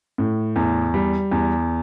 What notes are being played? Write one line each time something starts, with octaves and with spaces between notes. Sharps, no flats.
A2
E2
G3
E2